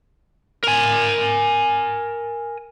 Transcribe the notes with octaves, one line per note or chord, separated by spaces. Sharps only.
A#4 G#5